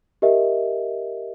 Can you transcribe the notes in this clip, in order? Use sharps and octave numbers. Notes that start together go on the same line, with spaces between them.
G4 A#4 D#5 E5